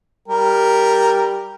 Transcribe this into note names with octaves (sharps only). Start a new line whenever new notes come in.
G3 A#4 G5